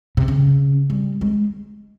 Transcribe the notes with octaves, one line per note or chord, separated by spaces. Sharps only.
C3
C#3
G3
G#3